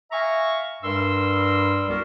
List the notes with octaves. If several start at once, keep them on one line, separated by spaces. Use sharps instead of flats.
E5 F5 G#5 A#5 C#6
G2 G3 A#4 C6 E6
C2 B3 F#4 A#4